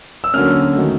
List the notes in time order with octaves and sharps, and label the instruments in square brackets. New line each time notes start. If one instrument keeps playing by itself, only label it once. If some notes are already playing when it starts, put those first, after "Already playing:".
[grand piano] E6
D3 F#3 A#3 C#4 F6
D#3 F#3 A3